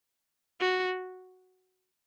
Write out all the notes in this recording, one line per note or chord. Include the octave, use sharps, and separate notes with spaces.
F#4